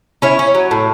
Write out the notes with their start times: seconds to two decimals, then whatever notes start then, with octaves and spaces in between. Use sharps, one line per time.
0.22 C#4 E4 C#5
0.39 C#4
0.54 F#3
0.71 A2